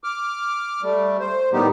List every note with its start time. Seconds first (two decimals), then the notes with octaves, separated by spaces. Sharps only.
0.04 D6 F6
0.83 G3 A3
1.20 C5
1.53 A2 D#3 G3 B3 D#4 G4